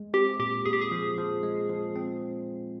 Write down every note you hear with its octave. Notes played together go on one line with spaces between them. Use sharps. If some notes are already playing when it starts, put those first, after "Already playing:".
Already playing: G#3
C4 G4
A#2 G4
A#2 G#4
G4
G#4
F3
F3
G#3
F3
C4